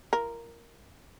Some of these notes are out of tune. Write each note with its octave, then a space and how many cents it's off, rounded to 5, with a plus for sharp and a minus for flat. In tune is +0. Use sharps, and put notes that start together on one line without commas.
F4 -40 A#4 +0